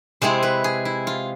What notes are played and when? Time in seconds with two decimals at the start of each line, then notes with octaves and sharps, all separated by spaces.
0.22 C3 G#3 C4 E4 C5
0.43 B4
0.64 G#4
0.85 E4
1.07 F4